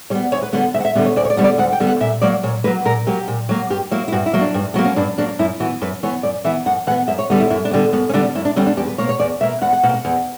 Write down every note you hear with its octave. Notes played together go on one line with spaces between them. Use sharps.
G3 B3 C#5
D2 C#5
B4
D3 G3 B3 F#5
D2 E5
F#5
E5
D3 G3 B3
C#5
D2 D5
C#5
D5
D3 G3 B3 C#5
D5
D2 F#5
G5
D3 G3 B3
F#5
A#2 E5
F#3 A#3 D5
A#2 C#5
F#3 A#3 B4
A#2 A#4
F#3 A#3 G4
A#2
F#3 A#3
G2 G4
F#3 A#3 E4
E4
G2 F#4
E4
F#3 A#3
D4
G2
F#3 A#3 B3
C#4
G2 D4
F#3 A#3 D4
F#2 E4
E3 B3 F#4
F#2 B4
E3 B3 C#5
F#2 D5
E3 B3 E5
F#2 F#5
E3 B3 F#5
F#2 E5
C#5
D3 G3 B3
E4
F#2 E4
D4
D3 G3 B3
F#2 B3
C#4
D3 G3 B3 D4
F#2 E4
D4
D3 G3 B3 C#4
D4
E2 G4
B4
B2 A#3 C#5
C#5
E2 D5
B2 A#3 E5
E2 F#5
F#5
B2 A#3 F#5
G5
F#5
E2